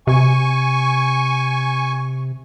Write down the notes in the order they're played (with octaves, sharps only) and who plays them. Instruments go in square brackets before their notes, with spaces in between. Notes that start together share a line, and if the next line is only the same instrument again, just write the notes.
[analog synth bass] C3 [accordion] G#5 C#6